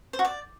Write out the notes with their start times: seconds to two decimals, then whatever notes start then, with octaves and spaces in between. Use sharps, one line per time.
0.13 C5
0.19 F#4
0.25 D5